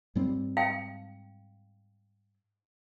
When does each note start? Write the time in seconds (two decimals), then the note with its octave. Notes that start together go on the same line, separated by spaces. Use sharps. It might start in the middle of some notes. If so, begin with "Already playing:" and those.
0.15 G#2 G3 C4
0.57 F5 G5